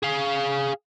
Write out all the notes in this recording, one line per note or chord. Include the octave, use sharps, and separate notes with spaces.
G#4 F5